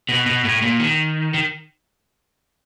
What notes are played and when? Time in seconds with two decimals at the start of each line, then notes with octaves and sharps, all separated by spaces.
0.09 B2
0.26 B2
0.45 A2
0.62 A#2
0.80 D#3
1.34 D#3